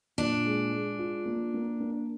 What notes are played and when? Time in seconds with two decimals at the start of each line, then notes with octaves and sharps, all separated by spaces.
0.18 A#2 D4
0.45 G#3
0.72 G#3
0.99 F4
1.26 A#3
1.54 A#3
1.80 A#3